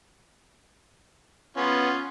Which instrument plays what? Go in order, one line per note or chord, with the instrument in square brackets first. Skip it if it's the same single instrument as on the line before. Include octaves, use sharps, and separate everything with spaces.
[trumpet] B3 [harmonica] C#4 F4